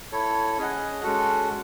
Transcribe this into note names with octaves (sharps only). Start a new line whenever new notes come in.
E4 A4 C#5
C#4 G#4 D#5 F#5
G#3 C#4 F#4 A4